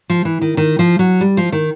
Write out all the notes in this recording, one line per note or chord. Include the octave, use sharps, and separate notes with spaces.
F3
E3
D#3
D#3
F3
F#3
G3
F3
D#3